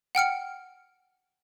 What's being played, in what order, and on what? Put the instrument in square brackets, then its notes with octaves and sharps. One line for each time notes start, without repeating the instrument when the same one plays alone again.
[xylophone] F#5 G5 F6 C#7